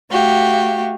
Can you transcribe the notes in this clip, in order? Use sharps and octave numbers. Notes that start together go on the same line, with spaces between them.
A3 F#4 G4 F5